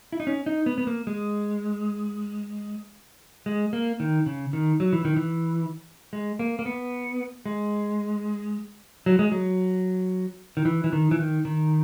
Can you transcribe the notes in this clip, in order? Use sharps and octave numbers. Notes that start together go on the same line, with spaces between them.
E4
D#4
C#4
D#4
B3
B3
A#3
G#3
G#3
A#3
D#3
C#3
D#3
F#3
E3
D#3
E3
G#3
A#3
A#3
B3
G#3
F#3
G#3
F#3
D#3
E3
E3
D#3
E3
D#3
D#3